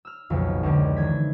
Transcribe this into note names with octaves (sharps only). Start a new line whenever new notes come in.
E6 F6
D#1 B1 F2 C#3
C#2 D3
D#3 E3 G#6 B6